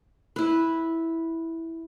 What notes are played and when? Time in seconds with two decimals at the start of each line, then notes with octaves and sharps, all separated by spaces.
0.36 E4 B4